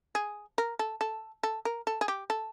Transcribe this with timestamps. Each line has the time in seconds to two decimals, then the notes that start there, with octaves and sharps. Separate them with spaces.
0.15 G#4
0.58 A#4
0.79 A4
1.01 A4
1.43 A4
1.65 A#4
1.87 A4
2.01 G#4
2.08 G4
2.30 A4